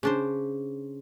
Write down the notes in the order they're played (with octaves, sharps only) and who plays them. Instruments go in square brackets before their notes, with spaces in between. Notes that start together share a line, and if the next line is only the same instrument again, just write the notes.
[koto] C#3 D4 C5